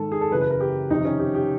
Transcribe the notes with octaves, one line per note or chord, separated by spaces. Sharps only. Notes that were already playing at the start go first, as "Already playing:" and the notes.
Already playing: G#2 D#3 A4
G#4
A4
F#2 C#3 E3 B4
B4
A#4
G4
F2 C3 D#3 D#4
C#4
G4
G4